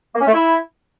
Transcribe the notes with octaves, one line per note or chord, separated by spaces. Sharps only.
A#3
C#4
A3
E4